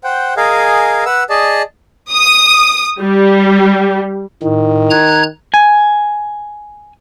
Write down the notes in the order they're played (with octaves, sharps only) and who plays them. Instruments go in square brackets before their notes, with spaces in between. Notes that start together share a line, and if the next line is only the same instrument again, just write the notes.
[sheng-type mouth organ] C5 F#5 G5
G#4 A#4 D#5 F5 G#5
B4 F#5 E6
G#4 D5 D#5 A5
[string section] D#6
G3
[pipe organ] A2 [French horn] D#3
[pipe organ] A#5 F#6 G#6
[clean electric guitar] G#5